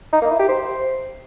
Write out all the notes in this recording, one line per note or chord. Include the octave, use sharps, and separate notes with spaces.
D#4
A#3
E4
G4
C5